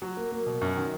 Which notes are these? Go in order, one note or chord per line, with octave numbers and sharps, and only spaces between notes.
F#3
A#3
A#3
B2
F#2
D#3